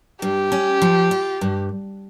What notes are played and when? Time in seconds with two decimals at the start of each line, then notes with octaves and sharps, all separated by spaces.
0.22 G2 G4
0.52 C#4
0.82 F3
1.11 F4
1.41 G2